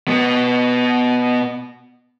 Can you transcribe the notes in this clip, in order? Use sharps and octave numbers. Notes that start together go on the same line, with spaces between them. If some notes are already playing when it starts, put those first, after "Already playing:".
B2 B3